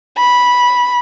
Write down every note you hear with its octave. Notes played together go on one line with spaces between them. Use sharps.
B5